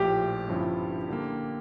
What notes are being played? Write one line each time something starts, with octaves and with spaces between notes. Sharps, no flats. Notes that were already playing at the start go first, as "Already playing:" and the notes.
Already playing: A#1 A2 F3 G4
G1 G2 F3 C#4 E4
D3 G3 A#3